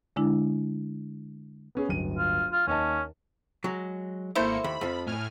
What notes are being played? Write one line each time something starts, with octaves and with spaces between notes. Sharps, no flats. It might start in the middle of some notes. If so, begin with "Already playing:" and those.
D3 G#3 D4 E4
B3 C#4 G#4
D1 G1 D#7
F4
F4
D#2 C#4 D#5 A5
F#3 G#3
G#1 A3 A#3 E4 C5 C#7
D#2 B5
F2 F3
A2 G#5 F6